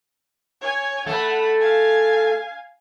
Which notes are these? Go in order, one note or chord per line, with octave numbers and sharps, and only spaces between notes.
C#5 G#5
A3 A4 F#5 B5
F5 G#5